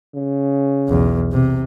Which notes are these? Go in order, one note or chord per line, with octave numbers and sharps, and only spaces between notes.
C#3
B1 E2
C3